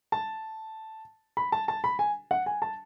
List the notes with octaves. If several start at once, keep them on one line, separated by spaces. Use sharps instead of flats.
A5
B5
A5
A5
B5
G#5
F#5
G#5
A5